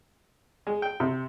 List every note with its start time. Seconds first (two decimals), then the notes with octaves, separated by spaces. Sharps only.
0.67 G#3
0.82 G5
1.00 C3